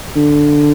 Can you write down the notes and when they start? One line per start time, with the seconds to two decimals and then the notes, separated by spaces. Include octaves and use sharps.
0.17 D3